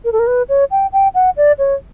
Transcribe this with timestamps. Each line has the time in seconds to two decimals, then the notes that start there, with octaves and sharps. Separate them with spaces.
0.05 A#4
0.12 A4
0.19 A#4
0.27 B4
0.49 C#5
0.71 G5
0.93 G5
1.14 F#5
1.37 D5
1.59 C#5